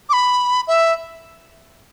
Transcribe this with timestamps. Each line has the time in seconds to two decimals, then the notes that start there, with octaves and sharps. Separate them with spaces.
0.09 D6
0.13 B5
0.67 E5